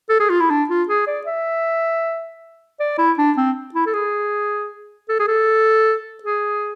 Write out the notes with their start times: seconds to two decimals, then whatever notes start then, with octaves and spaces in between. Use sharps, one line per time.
0.09 A4
0.20 G#4
0.30 F4
0.40 E4
0.50 D4
0.70 F4
0.89 G#4
1.07 D5
1.27 E5
2.80 D5
2.98 E4
3.18 D4
3.37 C4
3.74 E4
3.86 A4
3.93 G#4
5.09 A4
5.20 G#4
5.28 A4
6.24 G#4